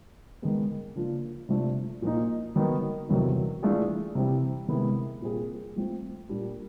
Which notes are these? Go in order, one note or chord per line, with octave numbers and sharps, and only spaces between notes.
D#3 G#3 B3
C#3 F3 A#3 D4 F4
C3 F3 A3 D4
A#2 F3 A#3 D#4
D#3 F#3 B3 D#4
E2 C3 D#3 F#3
E3 A3 D4 F4 G#4
C3 E3 G3 C4
C3 D#3 G#3 B3 E4
A#2 G3 C4 F4 G#4
F3 A3 C4
A#2 G3 A#3 D4 G4